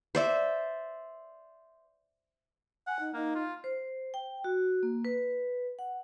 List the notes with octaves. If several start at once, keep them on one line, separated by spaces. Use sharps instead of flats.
C5 D5 E5
F#5 G#5
D#4
A#3 D#4
F4
C5
G5
F#4
A#3
B4
F#5